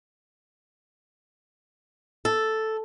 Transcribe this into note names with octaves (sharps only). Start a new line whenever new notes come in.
A4